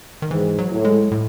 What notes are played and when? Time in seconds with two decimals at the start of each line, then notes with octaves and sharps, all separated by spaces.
0.22 D#3
0.31 G#2 E3
0.58 F#3
0.71 A2
0.85 G#3
1.11 A2